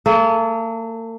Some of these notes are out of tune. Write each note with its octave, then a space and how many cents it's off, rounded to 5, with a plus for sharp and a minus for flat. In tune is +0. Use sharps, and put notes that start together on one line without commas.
A#3 -45 A4 -25